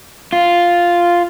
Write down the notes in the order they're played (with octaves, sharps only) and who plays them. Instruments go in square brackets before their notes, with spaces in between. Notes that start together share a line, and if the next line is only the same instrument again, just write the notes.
[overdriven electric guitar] F4